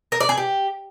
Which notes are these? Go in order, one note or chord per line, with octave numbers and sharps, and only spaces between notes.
A#4
D5
G#4
G4